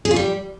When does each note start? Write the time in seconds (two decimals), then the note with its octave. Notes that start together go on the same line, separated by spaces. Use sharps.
0.05 G#4
0.11 F4
0.16 G3